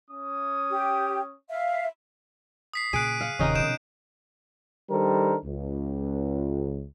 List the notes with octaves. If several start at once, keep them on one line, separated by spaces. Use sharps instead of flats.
C#4 D#6
G4
E5 F5
D#6 B6 C7
A#2 C#3 G#4 F#6 D7 D#7
F5 F#5
D1 C3 D#3 C#4 D#4 D#6
B2 F3 G6 D7 E7
D#3 G3 D4 A4 A#4 C5
C#2